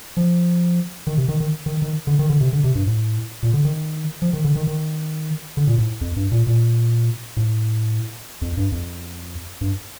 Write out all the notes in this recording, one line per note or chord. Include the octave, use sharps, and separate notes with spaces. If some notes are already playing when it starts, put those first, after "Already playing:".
F3
D#3
C3
D#3
D#3
D#3
D#3
D3
D#3
D3
C3
D3
C3
G2
A2
A#2
D3
D#3
F3
D#3
D3
D#3
D#3
D3
A#2
A2
F2
G2
A#2
A#2
A2
F2
G2
F2
G2